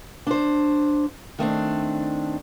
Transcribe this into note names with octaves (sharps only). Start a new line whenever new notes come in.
D4 C5
D#3 A3 C4 D4